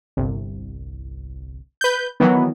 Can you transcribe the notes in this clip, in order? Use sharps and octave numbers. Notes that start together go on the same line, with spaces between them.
G1 C2
B4 G6
D#3 E3 F#3 B3